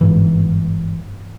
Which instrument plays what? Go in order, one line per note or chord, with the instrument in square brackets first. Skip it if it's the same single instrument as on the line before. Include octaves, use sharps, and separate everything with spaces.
[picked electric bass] G1 G#2 E3